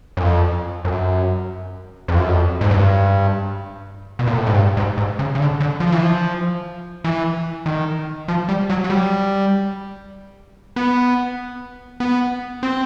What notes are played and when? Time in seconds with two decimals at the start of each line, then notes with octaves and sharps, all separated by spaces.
0.17 F#2
0.23 F2
0.85 F#2
2.08 F2
2.19 F#2
2.29 F2
2.61 G#2
2.71 G2
4.19 B2
4.27 A#2
4.38 A2
4.47 G#2
4.56 G2
4.77 G#2
4.97 G#2
5.19 C#3
5.35 C#3
5.40 D3
5.60 D3
5.80 F3
5.92 E3
6.03 F3
7.04 E3
7.66 D#3
8.28 F3
8.49 G3
8.70 F#3
8.84 F#3
8.90 G3
10.76 B3
12.00 B3
12.63 C4